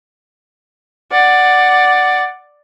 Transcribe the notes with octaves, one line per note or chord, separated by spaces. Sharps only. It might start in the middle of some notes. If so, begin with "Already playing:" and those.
D5 F#5